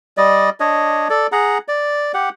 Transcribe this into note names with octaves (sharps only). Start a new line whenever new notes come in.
G3 D5 D#5
D4 C#5 D#5
A4 D5
G#4 F#5 A#5
D5
G4 F#5